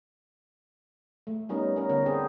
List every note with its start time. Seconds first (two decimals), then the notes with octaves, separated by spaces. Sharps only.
1.27 A3
1.49 G3 B3 C#4 D#4 A#4
1.76 C#4 A#4
1.89 D3 B3 A#4
2.06 C4 D4 G#4 C5